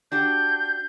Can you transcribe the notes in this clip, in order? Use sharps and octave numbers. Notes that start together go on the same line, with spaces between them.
D4 F#4 G4 G6